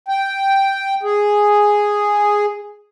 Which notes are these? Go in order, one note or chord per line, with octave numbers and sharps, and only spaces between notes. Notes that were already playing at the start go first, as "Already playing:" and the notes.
G5
G#4